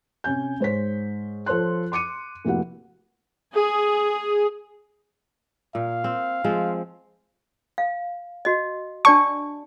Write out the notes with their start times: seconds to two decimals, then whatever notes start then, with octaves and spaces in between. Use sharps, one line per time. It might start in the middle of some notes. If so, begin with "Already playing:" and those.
0.24 C3 C#4 G#5 G6
0.60 G#2 C5 C#5 B6
1.46 F3 A4 C5 C#5 C6 F#6
1.92 C6 D6 C#7 D#7
2.45 F1 A#3 E4 F#4 F#5
3.55 G#4
5.75 A#2 F5
6.04 C4
6.44 F3 G#3 C4
7.78 F5
8.45 F#4 D#5
9.05 D4 D5 A5 C#6